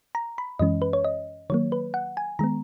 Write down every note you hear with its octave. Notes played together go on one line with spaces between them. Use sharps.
A#5
B5
F#2 E3 G#3 C#4 D#5
B4
C#5
D#5
D#3 F#3 A#3 C#5
B4
F#5
G#5
D#3 G#3 B3 A#5